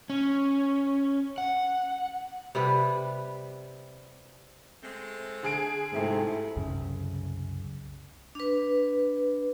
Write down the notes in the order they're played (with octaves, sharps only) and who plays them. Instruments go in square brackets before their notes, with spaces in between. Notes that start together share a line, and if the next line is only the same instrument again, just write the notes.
[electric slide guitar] C#4
F#5
[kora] C3 G3 B4
[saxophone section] G#3 A3 C4
[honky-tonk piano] D3 G#4 D7
[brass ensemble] G#2 C3 A3 [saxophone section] F3 E4
[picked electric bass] C2 F#2 C#3
[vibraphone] D4 B4